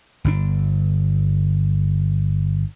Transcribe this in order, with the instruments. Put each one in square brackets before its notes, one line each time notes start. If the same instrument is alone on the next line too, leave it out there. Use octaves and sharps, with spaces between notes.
[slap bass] G1 B2 D4